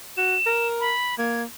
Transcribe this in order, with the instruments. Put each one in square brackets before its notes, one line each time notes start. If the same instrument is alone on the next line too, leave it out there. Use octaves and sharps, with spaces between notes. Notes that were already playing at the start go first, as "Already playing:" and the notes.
[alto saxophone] F#4 [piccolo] E7
[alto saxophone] A#4
[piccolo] B5
[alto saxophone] A#3 [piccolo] G#6